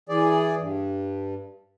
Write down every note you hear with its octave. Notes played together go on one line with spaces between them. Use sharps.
E3 G#4 D5
G2